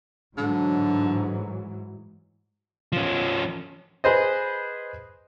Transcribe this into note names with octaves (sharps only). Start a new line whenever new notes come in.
G#2 D3 E3 F#3
F3 C#4
G#4 B4 C5 D#5